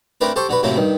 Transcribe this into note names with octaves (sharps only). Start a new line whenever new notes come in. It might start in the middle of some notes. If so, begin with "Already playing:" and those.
A3 C4 D4 A#4 B4
G4 A4 C5 C#6
D3 F#4 B4
A2 C3 F#3 A3 A#3 E4
G2 D#3